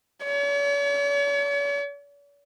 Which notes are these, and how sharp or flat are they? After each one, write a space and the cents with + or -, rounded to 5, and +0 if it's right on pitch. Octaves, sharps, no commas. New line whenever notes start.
C#5 +45